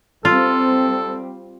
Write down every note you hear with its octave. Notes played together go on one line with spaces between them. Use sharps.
G3 C4 F4 A4